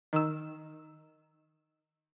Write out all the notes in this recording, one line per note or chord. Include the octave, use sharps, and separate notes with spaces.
D#3 E6